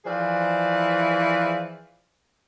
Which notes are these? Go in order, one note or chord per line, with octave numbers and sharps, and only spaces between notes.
E3 F3 G#4 C5 D5